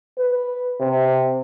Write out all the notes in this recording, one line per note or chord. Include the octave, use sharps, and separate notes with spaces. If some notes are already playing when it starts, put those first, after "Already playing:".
B4
C3